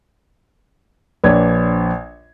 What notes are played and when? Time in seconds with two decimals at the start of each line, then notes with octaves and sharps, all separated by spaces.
1.24 A#1 D4 B4 C#5 G#6